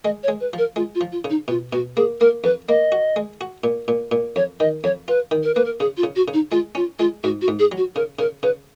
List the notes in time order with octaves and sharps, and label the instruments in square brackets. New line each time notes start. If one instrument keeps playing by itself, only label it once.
[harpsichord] G#3 [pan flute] D#5
[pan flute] C#5
[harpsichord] G#3
[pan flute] B4
[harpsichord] F3 [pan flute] A#4
[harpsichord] G#3 [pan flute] F4
[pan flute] F4
[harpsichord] F3
[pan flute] F4
[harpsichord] C#3
[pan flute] D#4
[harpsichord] B2 [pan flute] F4
[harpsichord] B2 [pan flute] F#4
[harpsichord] A#3 [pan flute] G#4
[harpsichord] A#3 [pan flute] A#4
[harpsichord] F2 [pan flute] B4
[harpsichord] A#3 [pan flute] D#5
[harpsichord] F#4
G#3
F#4
A#2
A#2
A#2
[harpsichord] F2 [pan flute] C#5
[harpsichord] D#3 [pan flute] D#5
[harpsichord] F2 [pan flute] C#5
[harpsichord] F4 [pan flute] B4
[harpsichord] D#3
[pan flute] A#4
[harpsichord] A#3 [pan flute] B4
[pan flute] A#4
[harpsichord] C#3 [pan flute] G#4
[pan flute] F4
[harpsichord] C#3
[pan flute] F#4
[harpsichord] C#3
[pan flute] D#4
[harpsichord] G#3 [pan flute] F4
[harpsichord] C#4 [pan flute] F4
[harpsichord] G#3 [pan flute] F4
[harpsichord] G#2 [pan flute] F#4
[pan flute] F#4
[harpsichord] G#2
[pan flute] G#4
[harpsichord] F#3
[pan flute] F#4
[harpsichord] C#3 [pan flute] A#4
[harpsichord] C#3 [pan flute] A#4
[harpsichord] C#3 [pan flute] B4